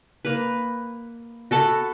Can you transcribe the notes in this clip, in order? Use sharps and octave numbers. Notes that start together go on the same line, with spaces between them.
A#3 B4
F#4 A4 A5 B5